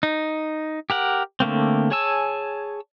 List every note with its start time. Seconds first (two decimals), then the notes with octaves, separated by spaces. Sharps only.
0.03 D#4
0.90 G4 A#4 F#5
1.40 D3 A3 A#3 C4
1.91 G#4 C#5 G#5 A5 E6